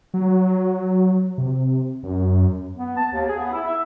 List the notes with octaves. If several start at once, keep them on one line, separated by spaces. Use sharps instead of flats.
F#3
C3
F#2
B3
A5
D#2
G#4
B3
E4
E5